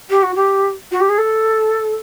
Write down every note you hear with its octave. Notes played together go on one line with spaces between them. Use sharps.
G4
F#4
G4
F#4
G4
G#4
A4